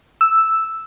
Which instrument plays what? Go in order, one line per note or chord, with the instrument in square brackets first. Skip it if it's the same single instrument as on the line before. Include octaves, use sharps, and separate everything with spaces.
[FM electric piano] E6